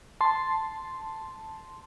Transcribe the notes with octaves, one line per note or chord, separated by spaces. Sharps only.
A5 C6